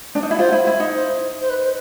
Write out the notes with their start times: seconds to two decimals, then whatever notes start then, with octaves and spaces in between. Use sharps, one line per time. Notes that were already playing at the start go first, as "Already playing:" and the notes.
0.15 D4
0.23 D#4
0.31 E4
0.39 F4 C5
0.52 E4
0.67 E4
0.80 D#4
0.94 C5
1.41 C5
1.49 B4
1.63 C5